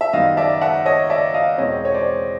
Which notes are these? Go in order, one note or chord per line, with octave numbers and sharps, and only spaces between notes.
E5
F#2 D#3 G3 B3 D#5 F5
D5 E5
E5 F#5
C#5 D#5
D5 E5
D#5 F5
E2 B2 G#3 C4 C#5 D#5
C#5
C5 D5